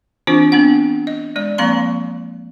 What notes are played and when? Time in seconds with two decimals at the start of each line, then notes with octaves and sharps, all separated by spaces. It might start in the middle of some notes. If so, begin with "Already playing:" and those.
0.27 E3 C4 D4 F4 C5
0.52 B3 C4 D4 F#5
1.07 D#5
1.36 G#3 D5
1.58 F3 A#3 C4 F5 A#5 C6